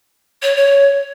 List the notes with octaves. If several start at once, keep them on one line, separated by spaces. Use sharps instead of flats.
C#5
C#5